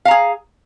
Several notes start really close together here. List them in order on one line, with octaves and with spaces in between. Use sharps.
F5 A#5 G#4